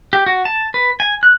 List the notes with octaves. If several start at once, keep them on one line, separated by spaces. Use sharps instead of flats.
G4
F#4
A5
B4
G#5
F#6